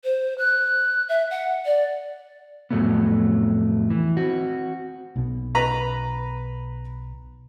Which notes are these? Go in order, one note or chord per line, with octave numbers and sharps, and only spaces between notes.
C5
F#6
E5
F#5
D5
F2 A2 C#3 F#3 A3 B3
E3
C4 F#4
B1 B2
B4 A#5 B5